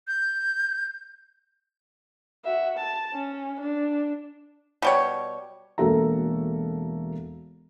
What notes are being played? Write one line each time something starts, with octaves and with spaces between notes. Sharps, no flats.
G6
F#4 E5
A5
C#4
D4
B2 G3 C#5
E1 A#3 F#4 A4 E5 A#5